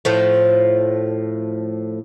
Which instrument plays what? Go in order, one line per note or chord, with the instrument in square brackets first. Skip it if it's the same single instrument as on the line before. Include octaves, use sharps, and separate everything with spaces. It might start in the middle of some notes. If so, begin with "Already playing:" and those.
[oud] A2 F3 A3